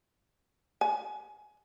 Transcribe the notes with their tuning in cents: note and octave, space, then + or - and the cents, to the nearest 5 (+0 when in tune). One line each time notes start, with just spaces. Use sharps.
G#5 +20